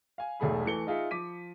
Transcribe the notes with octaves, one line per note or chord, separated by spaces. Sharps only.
F5 G#5
E1 B1 A3 G#4 B5
E3 A3 C#7 G7
D#4 F4 G#4 E5
F3 D6 B6 D#7